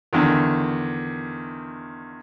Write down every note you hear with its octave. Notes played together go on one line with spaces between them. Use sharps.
E2 D3 D#3